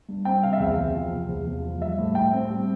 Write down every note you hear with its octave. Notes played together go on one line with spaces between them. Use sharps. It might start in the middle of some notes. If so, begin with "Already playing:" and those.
G2
C4 G5
C3 F5
E5
E2 F5
E2
F3
C3
E2
E2
F3
G3 E5
A2
A2 G5
C4
G3